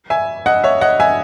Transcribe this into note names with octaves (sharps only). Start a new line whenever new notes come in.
E5 G#5
D#5 F#5
C#5 E5
D#5 F#5
E5 G#5